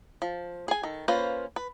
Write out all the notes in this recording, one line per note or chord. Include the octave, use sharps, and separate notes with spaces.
F3
G#4 G#5
D#3 A4
A#3 C#4 F4 B4 C5
B4